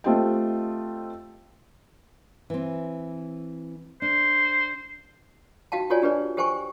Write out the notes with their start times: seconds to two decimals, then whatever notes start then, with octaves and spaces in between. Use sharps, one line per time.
0.04 A3 C4 F4 G4 D#5 G5
2.50 E3 C4
4.02 D4 C5
5.72 D#4 F#4 F5 G5 A5
5.90 F4 F#4 A4 C#5 D5 G#5
6.02 D4 G4 B4 D5
6.37 G4 A4 C5 G5 G#5 C#6